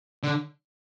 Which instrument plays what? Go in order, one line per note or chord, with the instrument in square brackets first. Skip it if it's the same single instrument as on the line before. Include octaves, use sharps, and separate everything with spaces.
[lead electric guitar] D3